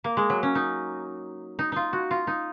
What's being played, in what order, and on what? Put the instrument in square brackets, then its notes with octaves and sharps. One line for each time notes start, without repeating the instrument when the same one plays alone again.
[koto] A#3
G#3
F#3
C#4
D#4
D#4
D#4 F4
F#4
F4
D#4